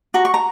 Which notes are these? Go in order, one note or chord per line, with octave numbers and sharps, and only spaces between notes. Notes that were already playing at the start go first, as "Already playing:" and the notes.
F#4 A#5
C#6
A#5